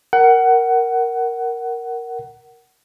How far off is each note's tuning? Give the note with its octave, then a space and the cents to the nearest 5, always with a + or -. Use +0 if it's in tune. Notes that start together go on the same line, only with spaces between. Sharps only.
A#4 +0 F#5 +20